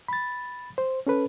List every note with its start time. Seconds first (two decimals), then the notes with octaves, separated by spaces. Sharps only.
0.08 B5 A6
0.78 C5
1.07 C#4 A4 B4